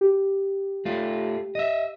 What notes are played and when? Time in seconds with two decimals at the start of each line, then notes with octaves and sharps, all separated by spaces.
0.01 G4
0.85 A3 F4
1.55 D#5 E5